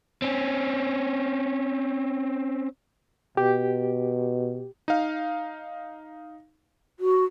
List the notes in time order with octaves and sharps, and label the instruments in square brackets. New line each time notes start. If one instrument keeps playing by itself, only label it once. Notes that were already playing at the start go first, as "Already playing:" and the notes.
[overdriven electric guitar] C4 C#4
[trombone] B2 [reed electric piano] G4
[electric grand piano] D#4 F5
[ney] F#4